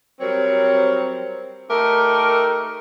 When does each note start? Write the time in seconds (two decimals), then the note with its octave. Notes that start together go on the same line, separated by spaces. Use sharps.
0.21 F#3 G3 C4 A#4 C#5
1.71 A3 D#4 G4 A#4